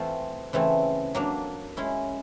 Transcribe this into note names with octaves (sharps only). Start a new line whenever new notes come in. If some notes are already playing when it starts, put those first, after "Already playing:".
Already playing: E3 A3 C4 F4
C#3 E3 A3 C4
F#3 A#3 D4
G#3 C#4 E4